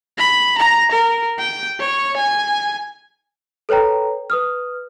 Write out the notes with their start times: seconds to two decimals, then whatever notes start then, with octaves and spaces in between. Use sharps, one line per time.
0.18 B5
0.58 A#5
0.92 A#4
1.39 G5
1.80 C#5
2.17 G#5
3.69 A4 B4 C#5 G5 A#5
4.30 B4 D#6 F6